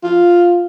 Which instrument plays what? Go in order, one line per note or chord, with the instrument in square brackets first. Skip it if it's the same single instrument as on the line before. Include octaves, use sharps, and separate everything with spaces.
[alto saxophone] F4